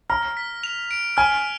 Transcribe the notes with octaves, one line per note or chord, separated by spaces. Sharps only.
A#5 F6
B6
F7
D7
G#5 F6